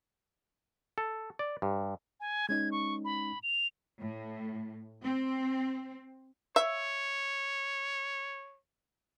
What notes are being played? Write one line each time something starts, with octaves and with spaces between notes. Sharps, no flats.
A4
D5
G2
G#5
G#3 C#4 D#4 G#6
C#6
B5
F7
A2
C4
C#5 E5